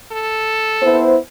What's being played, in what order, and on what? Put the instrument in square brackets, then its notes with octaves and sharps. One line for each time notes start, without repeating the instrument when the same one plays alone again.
[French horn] A4
[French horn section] B3 E4 C5